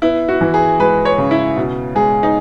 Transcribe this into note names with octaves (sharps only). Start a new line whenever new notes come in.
B3 E4
F#4
E3
G#4
G#3 B4
C#5
C#3
E4
B2
G#3 G#4
D#4